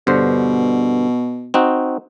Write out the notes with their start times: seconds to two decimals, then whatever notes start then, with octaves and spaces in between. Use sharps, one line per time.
0.07 G2 B2 D3 C5
1.54 C4 D#4 F#4